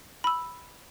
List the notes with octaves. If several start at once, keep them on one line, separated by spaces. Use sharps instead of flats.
B5 E6